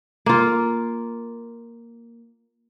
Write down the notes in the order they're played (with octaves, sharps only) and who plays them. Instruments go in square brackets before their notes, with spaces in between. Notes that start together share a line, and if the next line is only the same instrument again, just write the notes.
[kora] A#3 F4